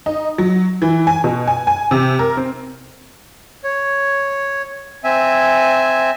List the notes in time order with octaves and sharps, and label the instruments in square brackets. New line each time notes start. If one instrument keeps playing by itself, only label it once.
[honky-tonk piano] D#4
F#3
E3
G#5
B2
G#5
G#5
C3
A#4
C4
[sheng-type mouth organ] C#5
C4 E5 G#5